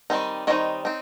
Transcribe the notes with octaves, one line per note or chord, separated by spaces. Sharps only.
D#3 G3 C4 D#4
D#3 G3 C4 D#4 C#5 D#5
C4 D#4